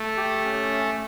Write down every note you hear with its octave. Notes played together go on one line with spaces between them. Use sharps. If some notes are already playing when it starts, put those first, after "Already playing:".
Already playing: A3
G4
C#4
E5